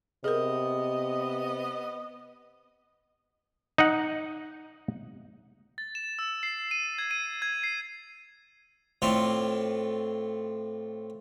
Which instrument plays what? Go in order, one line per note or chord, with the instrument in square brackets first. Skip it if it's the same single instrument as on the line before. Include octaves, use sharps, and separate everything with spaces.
[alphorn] C3 [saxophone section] B3 D#5 [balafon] G#4 A#4
[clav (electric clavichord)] D#4 F#5
[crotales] A6
E7
E6
C7
D#7
G#6
D#7
G#6
C7
[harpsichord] A2 C4 D4 F4